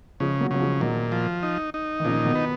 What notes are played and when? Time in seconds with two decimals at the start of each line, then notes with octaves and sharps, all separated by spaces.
0.20 C#3 F3 G#3
0.40 F#3 A#3
0.51 C#3 F#3
0.60 F3 G#3
0.81 A#2 D#3 F#3
1.12 F3
1.43 D#4
1.74 D#4
2.00 D#3
2.04 A#2 C#3 F3
2.24 B2 D#3
2.35 B3